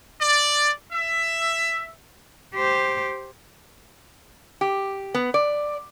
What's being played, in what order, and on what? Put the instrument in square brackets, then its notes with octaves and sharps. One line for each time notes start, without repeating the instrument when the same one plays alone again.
[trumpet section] D5
E5
[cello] G4 C5
[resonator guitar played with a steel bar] G4
B3
D5